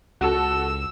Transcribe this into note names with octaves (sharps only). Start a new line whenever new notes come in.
C#2 F#4 A4 E6